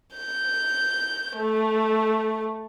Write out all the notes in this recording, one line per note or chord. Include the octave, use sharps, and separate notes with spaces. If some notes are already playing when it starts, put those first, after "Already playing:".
G6
A3